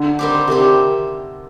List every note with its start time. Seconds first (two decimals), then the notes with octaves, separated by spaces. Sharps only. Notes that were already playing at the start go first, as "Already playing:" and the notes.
Already playing: D3
0.19 D#3 G3 C4 G4
0.48 C3 D#3 G3 C4 G4